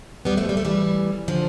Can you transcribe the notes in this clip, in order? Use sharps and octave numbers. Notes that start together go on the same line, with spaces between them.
G3 B3
F3 A3
G3
A3
E3 G3
D3 F3